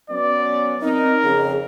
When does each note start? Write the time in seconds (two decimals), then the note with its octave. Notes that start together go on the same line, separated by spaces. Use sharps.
0.10 F#3 B3 C#4 D5
0.82 C4 D#4 A#4
1.24 F2 C#3 G#4